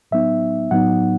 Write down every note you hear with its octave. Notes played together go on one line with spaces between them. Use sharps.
A2 F#3 B3 D#4 E5
A2 F#3 B3 D#4 F#5